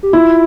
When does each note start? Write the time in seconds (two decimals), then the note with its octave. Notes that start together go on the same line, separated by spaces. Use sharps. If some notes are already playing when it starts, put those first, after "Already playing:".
0.03 G4
0.13 E4 F4